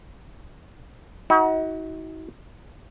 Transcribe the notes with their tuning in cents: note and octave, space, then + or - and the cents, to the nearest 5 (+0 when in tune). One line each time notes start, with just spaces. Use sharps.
D#4 +45 F#4 +10